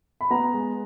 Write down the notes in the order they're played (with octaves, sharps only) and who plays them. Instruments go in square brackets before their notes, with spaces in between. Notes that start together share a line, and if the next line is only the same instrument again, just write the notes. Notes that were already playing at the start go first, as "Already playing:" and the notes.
[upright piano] B5
[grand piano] B3 [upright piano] F#5 A#5
[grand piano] G#3